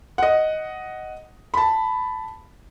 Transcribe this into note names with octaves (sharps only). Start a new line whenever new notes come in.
D#5 F#5
A5 B5